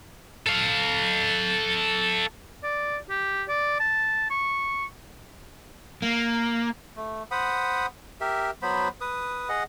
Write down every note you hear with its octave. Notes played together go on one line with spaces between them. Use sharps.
A4 F5
D5
G4
D5
A5
C#6
A#3
A3
C5 F#5 B5 D#6
G4 A#4 E5
F#3 B3 C5 B5
B4 D#6
G#4 D#5 F#5